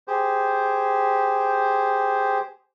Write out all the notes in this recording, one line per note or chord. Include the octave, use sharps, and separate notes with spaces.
G4 G#4 C5